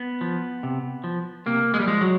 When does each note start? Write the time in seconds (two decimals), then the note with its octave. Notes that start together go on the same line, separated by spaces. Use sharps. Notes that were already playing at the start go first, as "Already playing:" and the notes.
Already playing: B3
0.21 F3
0.63 C3
1.04 F3
1.46 C3 A#3
1.74 G#3
1.80 G3
1.87 F3 G#3
2.01 F#3